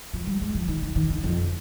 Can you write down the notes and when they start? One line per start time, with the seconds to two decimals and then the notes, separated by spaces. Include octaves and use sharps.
0.13 F3
0.27 G3
0.41 G#3
0.55 F3
0.68 D#3
0.82 D3
0.96 D#3
1.10 D3
1.23 F2